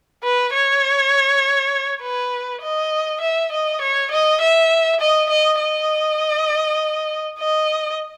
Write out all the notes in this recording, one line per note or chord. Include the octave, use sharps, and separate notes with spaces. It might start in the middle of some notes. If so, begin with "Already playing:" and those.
B4
C#5
B4
D#5
E5
D#5
C#5
D#5
E5
D#5
D#5
D#5
D#5